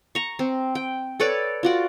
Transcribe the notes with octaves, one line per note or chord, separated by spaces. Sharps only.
A#5 C#6
C4
G5
A4 B4 C#5 D5
F4 F#4 D5